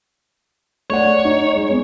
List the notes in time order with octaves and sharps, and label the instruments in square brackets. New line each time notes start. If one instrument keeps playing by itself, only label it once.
[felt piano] A3 D5 F#5 [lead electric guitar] C#5
[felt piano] D#4
G#3
G#3 B3 C4